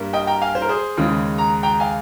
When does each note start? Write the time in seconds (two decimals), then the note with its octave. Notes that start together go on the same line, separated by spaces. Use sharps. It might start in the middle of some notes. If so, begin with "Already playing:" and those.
Already playing: G2 G3 A#3
0.13 D#5 G5
0.27 G5 A#5
0.42 F5 G#5
0.55 C5
0.62 A#4
0.69 G#4 C5
0.97 D#2 C#3 G#3
1.38 A#5
1.63 G5 A#5
1.80 F5 G#5